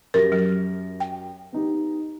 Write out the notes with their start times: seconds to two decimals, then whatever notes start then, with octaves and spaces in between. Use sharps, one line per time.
0.14 F#2 G4 A#4 A#6
0.32 F#3
1.00 G5
1.53 B3 D#4 G4